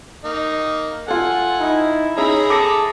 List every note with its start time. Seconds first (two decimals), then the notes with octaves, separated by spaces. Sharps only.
0.24 A#3 D#4
1.08 F4 A4 F#5 G#5
1.60 D#4 E4
2.17 C#4 D#4 G#4 E5 A#5 B5
2.50 A4 D6 A#6 C#7